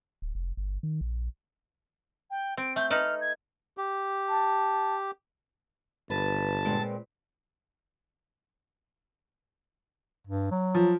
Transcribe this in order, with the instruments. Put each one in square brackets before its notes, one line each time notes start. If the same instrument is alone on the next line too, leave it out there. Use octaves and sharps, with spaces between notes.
[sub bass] D1
F1
G1
D#3
A#1
[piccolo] G5
[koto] C4 [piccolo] D7
[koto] A3 [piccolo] G6
[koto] D#4 A4 B4 [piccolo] F6
[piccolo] G#6
[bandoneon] G4
[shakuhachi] A5
[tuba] G1 [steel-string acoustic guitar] B4 [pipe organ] A5
[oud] A#2 G#3 C4
[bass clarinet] G2
F#3
[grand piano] F3